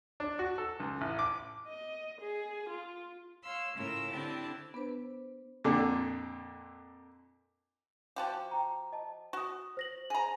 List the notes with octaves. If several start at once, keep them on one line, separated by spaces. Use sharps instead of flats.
D4
F#4
A4
C#2
A1
D6
D#5
G#4
F4
C#5 F5 C6 E6
A2 C#3 F4 A#4 E6
D3 C4 D4 E4 G4 A5
B3 D4 B4 C5
F2 A#2 D3
F3 F#4 G4 F5 G5 A5
G5 A#5
D#5 A5
F#4 C#6 D#6
C5 A#6 F#7
G#4 A#5